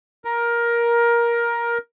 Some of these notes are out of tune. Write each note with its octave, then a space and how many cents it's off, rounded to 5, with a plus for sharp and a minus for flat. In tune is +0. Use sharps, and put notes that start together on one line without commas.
A#4 +15